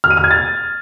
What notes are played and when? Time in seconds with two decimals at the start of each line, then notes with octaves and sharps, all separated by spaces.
0.04 F6
0.11 D#7
0.17 F6
0.24 G#6
0.31 A6